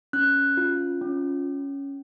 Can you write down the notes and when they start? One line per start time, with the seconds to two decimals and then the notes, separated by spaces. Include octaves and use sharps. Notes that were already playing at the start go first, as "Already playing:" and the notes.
0.13 C#4 F#6
0.57 F4
1.01 C#4